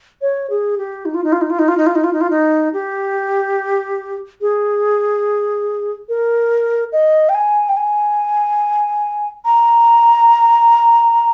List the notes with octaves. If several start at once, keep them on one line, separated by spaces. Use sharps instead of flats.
C#5
G#4
G4
D#4
F4
D#4
F4
D#4
F4
D#4
F4
D#4
F4
D#4
F4
D#4
F4
D#4
G4
G#4
A#4
D#5
G5
G#5
G5
G#5
A#5